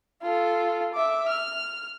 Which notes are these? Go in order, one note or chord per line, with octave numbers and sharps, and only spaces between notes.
F4 A4
E5 D6
F6